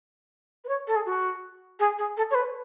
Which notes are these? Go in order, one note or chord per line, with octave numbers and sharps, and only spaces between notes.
B4
C#5
A4
G#4
F#4
G#4
G#4
A4
C#5
B4